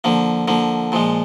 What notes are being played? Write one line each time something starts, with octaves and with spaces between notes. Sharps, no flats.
D3 F3 A#3
D3 F3 A#3
A#2 F3 G#3